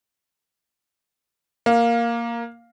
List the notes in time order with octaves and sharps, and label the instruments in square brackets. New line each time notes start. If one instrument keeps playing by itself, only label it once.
[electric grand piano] A#3 [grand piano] F5